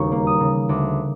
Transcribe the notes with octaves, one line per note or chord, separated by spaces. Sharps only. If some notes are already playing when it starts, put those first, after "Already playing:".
Already playing: E1 D#2 C#3 G3 C#6
A#3
D#6
C#3
D2 D6